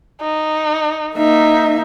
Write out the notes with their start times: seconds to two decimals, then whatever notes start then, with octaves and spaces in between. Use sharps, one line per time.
0.21 D#4
1.16 A#3 D#4 E5